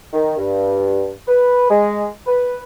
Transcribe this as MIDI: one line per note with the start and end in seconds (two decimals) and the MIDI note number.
0.13 0.36 51
0.38 1.11 43
1.28 1.70 71
1.70 2.09 56
2.27 2.62 71